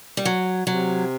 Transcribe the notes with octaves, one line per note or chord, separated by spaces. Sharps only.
G3
F#3
C3 F#3